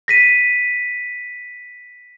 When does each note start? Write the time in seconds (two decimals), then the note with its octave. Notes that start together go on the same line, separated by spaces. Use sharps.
0.08 A#6 B6 D#7